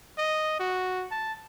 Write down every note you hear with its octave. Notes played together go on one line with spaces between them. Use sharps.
D#5
F#4
A5